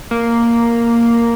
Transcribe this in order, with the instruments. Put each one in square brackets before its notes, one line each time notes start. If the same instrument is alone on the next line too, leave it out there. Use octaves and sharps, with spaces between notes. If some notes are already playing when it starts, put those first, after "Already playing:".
[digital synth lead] A#3